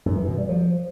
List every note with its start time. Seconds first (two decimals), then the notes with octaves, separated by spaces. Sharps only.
0.06 F#2
0.17 E3
0.27 B2
0.38 G3
0.49 F3